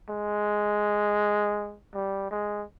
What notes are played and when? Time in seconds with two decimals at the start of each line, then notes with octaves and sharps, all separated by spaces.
0.09 G#3
1.94 G3
2.31 G#3